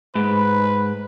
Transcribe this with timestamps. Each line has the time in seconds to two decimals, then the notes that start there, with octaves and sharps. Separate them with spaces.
0.15 G#2 B4